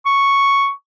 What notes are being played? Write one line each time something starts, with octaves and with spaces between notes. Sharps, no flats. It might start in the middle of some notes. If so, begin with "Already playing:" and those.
C#6